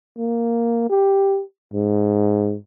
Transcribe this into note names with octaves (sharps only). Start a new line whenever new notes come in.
A#3
G4
G#2